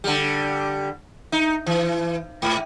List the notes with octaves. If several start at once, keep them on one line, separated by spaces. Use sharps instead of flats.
D3 G3
D#4
E3
G#2